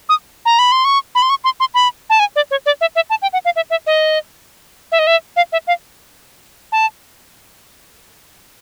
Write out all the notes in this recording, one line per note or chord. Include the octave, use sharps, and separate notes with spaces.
D#6
A#5
B5
C6
C#6
B5
C6
C#6
C6
C6
B5
A5
G#5
D5
C#5
D5
E5
E5
A5
G5
F#5
F5
E5
E5
D#5
E5
D#5
E5
F5
E5
F5
A5